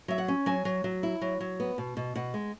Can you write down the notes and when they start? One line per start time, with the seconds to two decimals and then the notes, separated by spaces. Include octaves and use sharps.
0.08 F#3 E5
0.18 F#5
0.28 C#4
0.46 F#3 G#5
0.65 F#3
0.84 F#3
1.03 E4
1.21 F#3
1.41 F#3
1.60 B3
1.78 B2
1.97 B2
2.15 B2 F#5
2.34 G#3